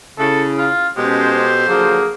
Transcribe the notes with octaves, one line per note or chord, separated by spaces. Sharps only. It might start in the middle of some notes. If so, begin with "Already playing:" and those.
C#3 E4 A4
F4
B2 G#3 C#4 G4 A4 C5
D3 F3 F#3 A#3 G#4